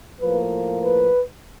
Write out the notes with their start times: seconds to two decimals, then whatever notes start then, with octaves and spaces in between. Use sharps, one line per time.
0.21 A2 F3 A#3 B4
0.84 B4